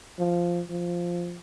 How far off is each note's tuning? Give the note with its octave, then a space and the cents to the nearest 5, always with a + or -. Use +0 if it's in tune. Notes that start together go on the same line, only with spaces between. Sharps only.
F3 -5
F3 +0